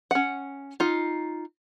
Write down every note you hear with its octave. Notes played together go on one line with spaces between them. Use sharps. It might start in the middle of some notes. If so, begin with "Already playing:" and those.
C#4 F#5
D#4 F4